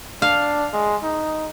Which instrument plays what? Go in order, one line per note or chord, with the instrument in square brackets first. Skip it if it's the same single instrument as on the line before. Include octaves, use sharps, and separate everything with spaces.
[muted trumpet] D4 [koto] F5
[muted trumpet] G#3
D#4